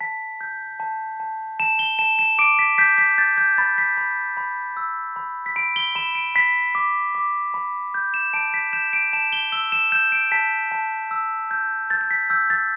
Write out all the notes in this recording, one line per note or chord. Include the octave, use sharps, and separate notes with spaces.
A5 B6
G6
A5
A5
A5 E7
G7
A5 E7
E7
D6 D7
B6
G6 B6
B6
G6 A6
G6
B5 A6
B6
B5
B5
E6
B5
B6
B5 D7
G7
B5 E7
D7
B5 B6
D6
D6
B5
G6
E7
A5 D7
B6
G6 E7
D7
A5 E7
G7
E6 G7
E7
G6 E7
D7
A5 B6
A5
E6
G6
G6 A6
A6
B6
E6 G6
A6